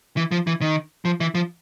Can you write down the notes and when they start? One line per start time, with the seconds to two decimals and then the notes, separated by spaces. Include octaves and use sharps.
0.17 E3
0.31 F3
0.47 E3
0.61 D#3
1.05 F3
1.20 E3
1.35 F3